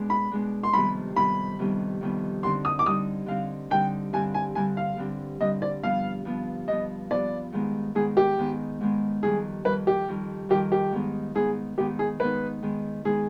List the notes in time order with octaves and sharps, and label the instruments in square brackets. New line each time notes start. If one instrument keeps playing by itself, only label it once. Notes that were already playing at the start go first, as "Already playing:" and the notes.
Already playing: [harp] B2 G#3 D4
[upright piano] B5
[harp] B2 G#3 D4
[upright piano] C6
[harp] F2 C3 D#3 G3 B3 [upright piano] B5
[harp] F2 C3 D#3 G3 B3 [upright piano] B5
[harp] F2 C3 D#3 G3 B3
F2 C3 D#3 G3 B3
[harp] D3 G3 C4 D#4 [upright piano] C6
[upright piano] D#6
D6
[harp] D3 G3 C4 D#4 [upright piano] D#6
[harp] D3 G3 C4 D#4 [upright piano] F5
[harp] D3 G3 C4 D#4 [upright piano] G5
[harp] G2 D3 G3 C4 [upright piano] G#5
[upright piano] G#5
[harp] G2 D3 G3 C4 [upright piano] G#5
[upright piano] F5
[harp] G2 D3 G3 C4
[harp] G2 D3 G3 C4 [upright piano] D#5
[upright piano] D5
[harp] G2 F3 B3 [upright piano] F5
[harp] G2 F3 B3
[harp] G2 F3 B3 [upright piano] D#5
[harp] G2 F3 B3 [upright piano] D5
[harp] G#2 D#3 G#3 B3
[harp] G#2 D#3 G#3 B3 [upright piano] G#4
[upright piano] G4
[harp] G#2 D#3 G#3 B3
G#2 D#3 G#3 B3
[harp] F2 D#3 G3 [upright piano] G#4
[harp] F2 D#3 G3 [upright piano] B4
[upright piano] G4
[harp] F2 D#3 G3
[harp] F2 D#3 G3 [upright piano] G4
[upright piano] G4
[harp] G#2 D#3 B3 D#4
[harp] G#2 D#3 B3 D#4 [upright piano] G#4
[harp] G#2 D#3 B3 D#4 [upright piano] G4
[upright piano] G#4
[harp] G#2 D#3 B3 D#4 [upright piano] B4
[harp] D#3 G#3 B3
[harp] D#3 G#3 B3 [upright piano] G#4